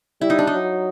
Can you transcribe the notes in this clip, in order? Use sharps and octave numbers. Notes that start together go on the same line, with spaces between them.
G3 E4
D#4
D4
F#3 D#4